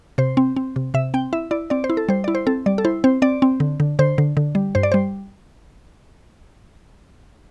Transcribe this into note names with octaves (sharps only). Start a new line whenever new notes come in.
C3 C5
C4
C4
C3
C3 E5
C4 G5
E4 E5
E4 D5
C4 D5
C5
E4
A4
G3 C5
E4 D5
C5
C4 A4
G3 D5
A4
E4 C5
C4 C5
C4 D5
C4
D3
D3
D3 C5
D3
D3
G3
G2 C5
D5
G3 C5